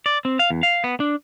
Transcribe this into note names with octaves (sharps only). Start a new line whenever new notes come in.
D5
C4
F5
E2
F5
B3
D4